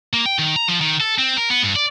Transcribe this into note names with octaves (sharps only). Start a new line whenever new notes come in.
A#3
G5
D#3
A#5
F3
D#3
A4
C4
A#4
B3
G2
D5